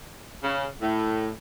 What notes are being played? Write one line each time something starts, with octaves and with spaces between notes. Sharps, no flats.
C#3
A2